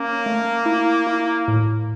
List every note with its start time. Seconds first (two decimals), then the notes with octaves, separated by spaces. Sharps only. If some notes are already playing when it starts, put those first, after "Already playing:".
Already playing: A#3 C#4
0.26 A3
0.66 E4
1.07 E4
1.48 A2